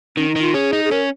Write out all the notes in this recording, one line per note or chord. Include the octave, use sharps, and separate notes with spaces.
D#3 C#4
D#4
D#3
F4
C#4 G#4
D#4
G#4
C#4 A#4